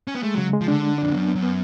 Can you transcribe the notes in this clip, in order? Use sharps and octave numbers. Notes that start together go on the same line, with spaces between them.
C#4
B3
G#3 A3
C#3 F#3
G#3
F3
D3 D4
D4
F2 D4
F#2 B3
B3
F#2
B3